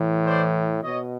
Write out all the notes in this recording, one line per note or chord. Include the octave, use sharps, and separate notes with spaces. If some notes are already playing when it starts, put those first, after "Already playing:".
Already playing: A2 E3
C5 D5
B2 C#5 D#5